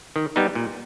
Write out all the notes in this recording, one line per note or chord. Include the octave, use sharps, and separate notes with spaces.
D#3
G3 B3 D#4
A#2